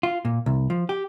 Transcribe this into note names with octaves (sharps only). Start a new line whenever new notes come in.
F4
A#2
C2
F3
G4